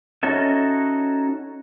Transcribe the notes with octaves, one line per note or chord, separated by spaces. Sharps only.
C#4 D#4 F#4 A4 E5